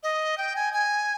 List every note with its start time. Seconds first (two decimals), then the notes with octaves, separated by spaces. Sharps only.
0.03 D#5
0.38 G5
0.56 G#5
0.73 G#5